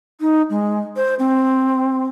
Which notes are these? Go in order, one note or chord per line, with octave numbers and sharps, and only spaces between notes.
D#4
G#3
C5
C4